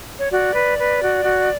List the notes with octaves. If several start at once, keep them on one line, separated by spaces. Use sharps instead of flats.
C#5
F#4 D5
B4
B4
F#4
F#4